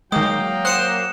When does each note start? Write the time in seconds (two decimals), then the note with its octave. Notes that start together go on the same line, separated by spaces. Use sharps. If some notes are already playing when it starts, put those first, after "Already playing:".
0.12 D#3 F#3 G#3 A#3 G5 D#6
0.65 C5 F#5 D#6 F#6 C#7 E7